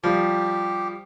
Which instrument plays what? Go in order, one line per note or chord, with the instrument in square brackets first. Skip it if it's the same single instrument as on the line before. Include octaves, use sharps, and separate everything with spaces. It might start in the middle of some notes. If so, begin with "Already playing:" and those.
[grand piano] F3 G3 [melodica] G4